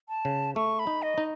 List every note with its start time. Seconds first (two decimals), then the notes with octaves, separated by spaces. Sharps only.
0.09 A5
0.25 C#3
0.56 A3 C#6
0.79 B5
0.87 D#4
1.02 D#5
1.18 D#4